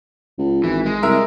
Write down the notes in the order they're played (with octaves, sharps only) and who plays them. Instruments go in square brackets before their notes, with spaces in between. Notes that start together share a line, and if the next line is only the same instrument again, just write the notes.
[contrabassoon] C#2
[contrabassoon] G#1 [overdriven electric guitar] E3
[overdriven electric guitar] G#3
[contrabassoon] C2 [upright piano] A#4 E5